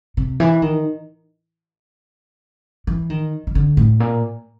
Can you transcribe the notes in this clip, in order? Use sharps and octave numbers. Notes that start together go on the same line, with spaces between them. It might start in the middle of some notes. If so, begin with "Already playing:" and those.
C3
E3
D#3
E3
D#3
D#3
D3
A2
A#2